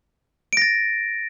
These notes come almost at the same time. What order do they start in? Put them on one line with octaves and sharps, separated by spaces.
D7 A#6 A6